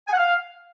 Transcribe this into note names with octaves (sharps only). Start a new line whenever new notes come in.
G#5
F#5
F5